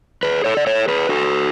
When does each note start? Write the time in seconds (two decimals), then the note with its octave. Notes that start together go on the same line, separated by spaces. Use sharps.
0.23 G#4 B4
0.44 A4 C#5
0.57 D5
0.67 A4 C#5
0.88 G#4 B4
1.09 F#4 A4